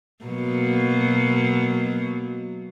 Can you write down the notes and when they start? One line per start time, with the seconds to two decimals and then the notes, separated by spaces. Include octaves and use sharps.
0.25 B2 F#3 A#3